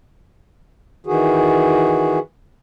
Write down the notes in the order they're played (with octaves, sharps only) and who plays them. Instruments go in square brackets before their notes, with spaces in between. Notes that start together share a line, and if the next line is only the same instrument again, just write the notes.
[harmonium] D#3 E3 F#4 G#4